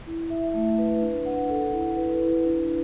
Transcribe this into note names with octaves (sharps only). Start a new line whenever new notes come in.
E4
E5
A3
B4
D4
F#5
A4
E4
B4
E4
D4
B4